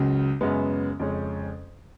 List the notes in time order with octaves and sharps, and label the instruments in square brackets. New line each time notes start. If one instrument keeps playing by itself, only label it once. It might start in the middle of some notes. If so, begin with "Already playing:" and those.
Already playing: [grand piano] C#2 C#3 F#3
F#2 C#3 G#3 B3
F2 C#3 G#3 C#4